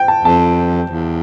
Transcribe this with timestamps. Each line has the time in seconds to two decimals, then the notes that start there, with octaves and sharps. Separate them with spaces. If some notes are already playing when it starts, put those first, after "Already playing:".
Already playing: G5
0.08 A5
0.25 F2 A5
0.90 E2